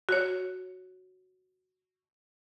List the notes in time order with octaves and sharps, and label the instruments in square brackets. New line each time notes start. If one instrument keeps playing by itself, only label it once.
[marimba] F#4 C#5